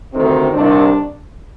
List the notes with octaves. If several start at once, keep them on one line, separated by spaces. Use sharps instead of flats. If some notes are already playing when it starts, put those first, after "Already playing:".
D2 C3 D#3 C4
C2 C3 D#3 D4